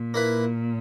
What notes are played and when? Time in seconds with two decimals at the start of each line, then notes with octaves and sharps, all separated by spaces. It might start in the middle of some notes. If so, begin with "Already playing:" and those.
Already playing: A#2
0.14 A#3 E4 B4